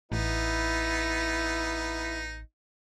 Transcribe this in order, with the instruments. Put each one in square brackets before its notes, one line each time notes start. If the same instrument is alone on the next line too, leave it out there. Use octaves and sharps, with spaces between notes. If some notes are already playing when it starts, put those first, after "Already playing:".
[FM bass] A1 [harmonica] B3 D#4 [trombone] E4